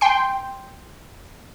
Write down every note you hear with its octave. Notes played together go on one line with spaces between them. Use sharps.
G5 C6